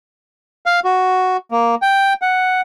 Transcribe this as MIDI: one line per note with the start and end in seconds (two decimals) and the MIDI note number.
0.66 0.80 77
0.84 1.37 66
1.51 1.75 58
1.82 2.13 79
2.22 2.61 78